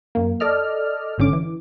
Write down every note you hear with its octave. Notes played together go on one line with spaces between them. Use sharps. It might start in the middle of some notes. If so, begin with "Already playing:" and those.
F#2 A#3
A4 D5 D#5 F6
G#1 G#2 D3 C#4 D6
E3